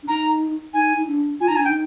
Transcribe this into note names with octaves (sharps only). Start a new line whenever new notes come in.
D4
D#4 A#5
D#4 G#5
D#4
D4
F4 G#5
D#4 A#5
D4 G#5
G5
D#4